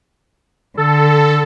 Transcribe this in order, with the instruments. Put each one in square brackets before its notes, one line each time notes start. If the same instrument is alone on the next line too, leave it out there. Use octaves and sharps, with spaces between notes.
[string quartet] D3 [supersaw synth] A4